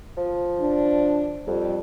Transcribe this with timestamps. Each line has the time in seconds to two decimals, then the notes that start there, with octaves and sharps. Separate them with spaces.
0.18 F3
0.60 D4
1.47 F2 G3